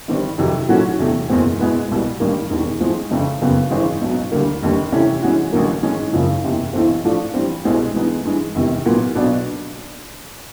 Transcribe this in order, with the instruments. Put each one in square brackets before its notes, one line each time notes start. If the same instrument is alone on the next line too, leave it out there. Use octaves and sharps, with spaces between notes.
[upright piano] G1 G2 D#3 G3 C4
F2 C3 D#3 F#3
A#2 F#3 A3 C#4 F#4
E2 C3 E3 A3
F#1 E2 B2 G#3 C4
B2 G#3 B3 E4
C2 B2 G3
A1 G2 D#3 G3 A#3
E1 D#2 D#3
A2 F3 G#3 C4
G1 F2 C#3
F#1 F2 C#3 F#3 B3
G#1 G2 E3 G#3 C4
B1 B2 F#3
D2 D3 G3 A#3
F1 D#2 D3 G3
C3 E3 A3 C#4 E4
G2 E3 G#3 C#4 F#4
A1 G2 D3 F#3 A#3
G#2 D#3 G#3 C#4
F#1 F#2 C#3 F3
F#1 E2 C3
B1 A2 E3 A3 C4
A2 F3 A3 D4 F4
G2 E3 G3 C4
C2 B2 G#3 C4 E4
G2 E3 G#3 B3 D#4
G2 E3 G#3
F1 E2 C3 D#3
A#2 F#3 B3
B1 B2 F#3 B3 D4